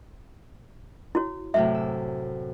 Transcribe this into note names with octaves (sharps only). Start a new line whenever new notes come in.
E4 F#4 C#5
F#2 A2 C3 E5
E6